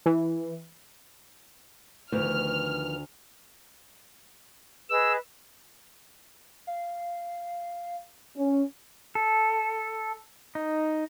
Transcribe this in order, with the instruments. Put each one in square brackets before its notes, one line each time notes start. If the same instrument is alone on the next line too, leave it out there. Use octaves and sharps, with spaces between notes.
[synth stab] E3
[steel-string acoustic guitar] D2 [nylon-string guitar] D#3 F3 B3 [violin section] F6
[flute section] G#4 B4 D#5 [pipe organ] E6
[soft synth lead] F5
[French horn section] C#4
[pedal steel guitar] A4
D#4